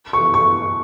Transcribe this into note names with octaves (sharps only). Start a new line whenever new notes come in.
C#6
C#6